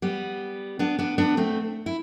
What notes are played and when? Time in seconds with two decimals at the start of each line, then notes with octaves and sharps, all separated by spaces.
0.02 G3 B3
0.79 B3 D4
0.99 B3 D4
1.18 B3 D4
1.37 A3 C4
1.86 E4